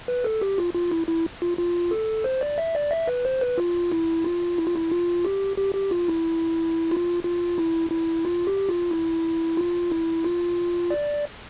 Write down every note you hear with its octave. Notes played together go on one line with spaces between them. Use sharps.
B4
A4
G4
F4
F4
E4
E4
F4
F4
A4
C5
D5
E5
D5
E5
B4
C5
B4
F4
E4
F4
E4
F4
E4
F4
G4
G4
G4
F4
E4
F4
F4
E4
E4
F4
G4
F4
E4
F4
E4
F4
D5